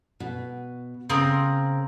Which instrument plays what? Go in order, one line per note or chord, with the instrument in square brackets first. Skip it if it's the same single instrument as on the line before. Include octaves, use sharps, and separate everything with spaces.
[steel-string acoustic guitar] B2
[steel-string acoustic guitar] C#3 [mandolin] C4 A#4 D#6